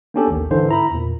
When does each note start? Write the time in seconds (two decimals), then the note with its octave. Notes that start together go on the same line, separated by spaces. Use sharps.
0.14 A#3 B3 C#4 D4 G4 A4
0.27 A1 D#2
0.50 G#2 D3 E3 C5
0.69 E4 A#5 B5
0.91 E2 A#2